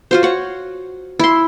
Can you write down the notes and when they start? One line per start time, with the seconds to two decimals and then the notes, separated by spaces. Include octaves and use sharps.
0.11 F4 F#4 C5
0.23 C#5 F#5
1.19 E4 C6